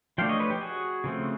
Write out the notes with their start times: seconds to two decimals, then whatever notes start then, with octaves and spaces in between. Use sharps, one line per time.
0.18 F3 A3 D4 F5 G5
0.29 C#5 D#5
0.40 B4 C#5
0.50 G4
0.61 F#4 G#4
1.04 C#3 F3 A3 C4